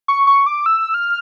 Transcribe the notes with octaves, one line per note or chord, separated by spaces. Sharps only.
C#6
C#6
D6
E6
F6